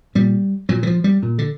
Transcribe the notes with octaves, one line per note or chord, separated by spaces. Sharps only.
A#2 G3
A#2 F#3
E3
F3
G3
A#2
D3